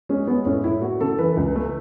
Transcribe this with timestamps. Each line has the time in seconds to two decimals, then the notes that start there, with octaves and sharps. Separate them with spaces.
0.09 G#3 C#4
0.27 G#3 B3
0.46 A2 C#4
0.64 A2 E4
0.82 A3 F#4
1.01 C#3 A4
1.19 E3 B4
1.37 C#2
1.55 A3